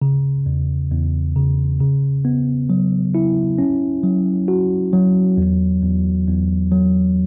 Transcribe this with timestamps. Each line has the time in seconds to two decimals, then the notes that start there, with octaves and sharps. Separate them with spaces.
0.02 C#3
0.46 E2
0.91 E2
1.36 C#3
1.80 C#3
2.25 B3
2.70 F#3
3.15 E4
3.58 C#4
4.04 F#3
4.48 F#4
4.93 F#3
5.38 E2
5.82 E2
6.27 E2
6.71 F#3